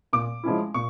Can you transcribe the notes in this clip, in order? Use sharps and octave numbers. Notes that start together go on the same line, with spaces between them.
A#2 D6
F3 G#3 C#4 E4
A#2 C#6